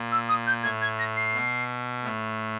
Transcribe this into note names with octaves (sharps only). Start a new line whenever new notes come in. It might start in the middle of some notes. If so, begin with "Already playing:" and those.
Already playing: A#2
E6
D#6
G6
A2 G#6
G#6
A#6
C7
B2
A2